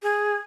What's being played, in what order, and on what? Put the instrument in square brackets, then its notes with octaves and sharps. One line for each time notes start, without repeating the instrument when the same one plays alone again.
[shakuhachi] G#4